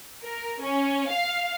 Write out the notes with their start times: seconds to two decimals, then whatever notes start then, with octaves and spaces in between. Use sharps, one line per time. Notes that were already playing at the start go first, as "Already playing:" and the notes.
0.24 A#4
0.61 C#4
1.10 F5